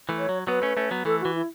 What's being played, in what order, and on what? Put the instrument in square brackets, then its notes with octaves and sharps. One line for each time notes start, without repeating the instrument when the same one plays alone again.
[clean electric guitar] E3 A3
[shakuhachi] C#5
[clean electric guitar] F#3
[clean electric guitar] F#3 B3 [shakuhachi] B4
[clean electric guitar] A3 C#4
A3 C#4
F#3 B3
[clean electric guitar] E3 A3 [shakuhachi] A4
[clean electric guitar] E3 [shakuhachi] F#4
[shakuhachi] E4